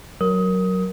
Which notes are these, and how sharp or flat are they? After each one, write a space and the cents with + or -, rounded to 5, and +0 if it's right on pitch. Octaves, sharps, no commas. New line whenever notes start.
F#3 +0 A#4 +0 D#6 +20